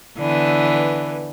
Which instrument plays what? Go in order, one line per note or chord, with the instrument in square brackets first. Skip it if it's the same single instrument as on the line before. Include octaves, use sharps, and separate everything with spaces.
[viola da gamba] D3 E3 B3